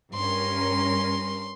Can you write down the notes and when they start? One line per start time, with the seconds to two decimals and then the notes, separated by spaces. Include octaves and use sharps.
0.15 G2 C#4 A#4 C6